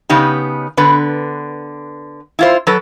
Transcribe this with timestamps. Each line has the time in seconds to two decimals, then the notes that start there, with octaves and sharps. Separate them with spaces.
0.09 C#3 B3 D#4 G4
0.77 D3 B3 B4
2.39 E4 F4 C5
2.67 F#3 A4 B4